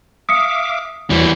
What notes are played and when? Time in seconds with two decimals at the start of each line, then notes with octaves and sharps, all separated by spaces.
0.29 E5 F5 D6 D#6 C#7
1.10 E2 E3 F#3 G3 C#6